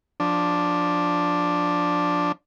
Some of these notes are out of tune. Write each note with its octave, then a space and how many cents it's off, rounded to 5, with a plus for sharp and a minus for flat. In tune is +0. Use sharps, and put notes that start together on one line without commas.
F3 +20 D4 +0